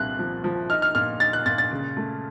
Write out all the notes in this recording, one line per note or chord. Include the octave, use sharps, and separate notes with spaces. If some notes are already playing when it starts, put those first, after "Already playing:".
Already playing: C2 A#2 F#6
F3
F3
D#4 F6
F6
A#2 F6
D#4 A6
F#6
A#2 A6
A6
C#3
A3